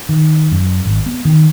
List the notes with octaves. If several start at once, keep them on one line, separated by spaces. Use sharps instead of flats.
D#3
F#2
G#1
B3
D#3